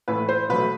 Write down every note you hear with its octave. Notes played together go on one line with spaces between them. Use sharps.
A2 E3 A3 B4
C5
B2 F#3 A3 B4